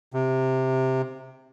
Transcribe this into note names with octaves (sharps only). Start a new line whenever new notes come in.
C3